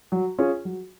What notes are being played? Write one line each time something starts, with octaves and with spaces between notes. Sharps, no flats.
F#3
C#4 F4 G#4
F#3